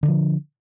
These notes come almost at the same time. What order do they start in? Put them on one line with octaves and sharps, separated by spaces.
D3 D4 F3